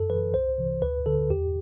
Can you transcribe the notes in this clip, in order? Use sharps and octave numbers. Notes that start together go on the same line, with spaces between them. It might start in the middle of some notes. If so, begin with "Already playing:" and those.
Already playing: F#2 A4
E3 B4
C2 C5
C3 E3
D2 B4
D3 A4
E2 G4